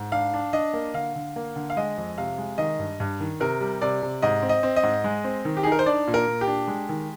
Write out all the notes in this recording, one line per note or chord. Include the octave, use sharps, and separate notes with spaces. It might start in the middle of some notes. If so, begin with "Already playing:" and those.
Already playing: G#2
D4 F5
D4
D4 D#5
A#3
D3 F5
D3
A#3
D3
F5
G#3 D#5
F2
C3 F5
G#3
D#3 D#5
G2
G2
D#3
C3 A#4
G3
C3 D5
C3
G#2 D#5
C4
D#5
C4
D#5
G#2
G#3
C4
D#3
G4
G#4
D#4
A#4
C5
D4 D5
A#2
A#4
A#2
G4
D4
G#3
D#3